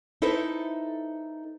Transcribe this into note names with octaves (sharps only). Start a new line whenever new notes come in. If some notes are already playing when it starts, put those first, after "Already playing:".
D#4 E4 A4 B4 C5 E5